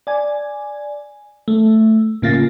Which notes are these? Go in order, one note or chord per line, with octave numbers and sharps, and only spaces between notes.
D5 G#5
A3
A2 C#3 A#3 F4 A6 A#6